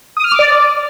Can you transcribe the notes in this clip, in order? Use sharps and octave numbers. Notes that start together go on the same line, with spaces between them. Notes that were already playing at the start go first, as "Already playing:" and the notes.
D#6
F6
D6
D5